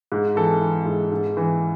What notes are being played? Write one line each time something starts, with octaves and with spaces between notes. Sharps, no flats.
G#2
E3 A4
E3
G#2
G#2
E3